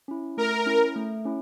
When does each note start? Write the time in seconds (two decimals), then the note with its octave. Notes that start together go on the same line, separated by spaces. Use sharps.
0.08 C#4 E4
0.37 A3 A#4
0.66 C#4 E4
0.96 A3
1.25 C#4 E4